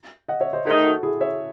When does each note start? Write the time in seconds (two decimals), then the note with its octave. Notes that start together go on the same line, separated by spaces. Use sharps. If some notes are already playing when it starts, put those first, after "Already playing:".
0.28 D#5 F#5
0.40 C#5 E5
0.53 C5 D#5
0.65 D#3 A3 D#4 G#4 C5
0.84 F#4 A4
1.03 E4 G#4
1.21 C#5 E5